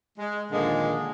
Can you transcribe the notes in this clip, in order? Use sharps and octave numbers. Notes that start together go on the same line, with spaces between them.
G#3
A#2 D3 D#3 F3 G#3 A#3